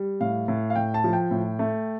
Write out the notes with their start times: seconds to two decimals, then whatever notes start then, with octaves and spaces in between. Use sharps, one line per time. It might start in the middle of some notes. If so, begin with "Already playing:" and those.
Already playing: G3
0.21 A2 F5
0.48 A2
0.70 F5
0.76 A2 G5
0.94 A5
1.04 F3
1.13 G5
1.31 A2
1.59 A3